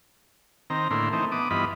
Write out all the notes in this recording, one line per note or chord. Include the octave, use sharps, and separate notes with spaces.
D#3 C4 A#5
A2 D3 A#3 E4 C6
E3 A3 C4 D#4
B3 D6 D#6
G2 E3 B3 F4 D#5 B5